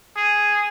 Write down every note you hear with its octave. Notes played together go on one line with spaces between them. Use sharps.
G#4